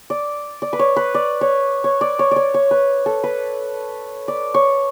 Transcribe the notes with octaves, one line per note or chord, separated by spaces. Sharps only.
D5
D5
B4
C#5
B4
D5
C#5
C#5
D5
C#5
C#5 D5
C#5
B4
A4
B4
D5
C#5